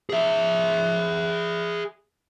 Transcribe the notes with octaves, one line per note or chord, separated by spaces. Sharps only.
G#4 E5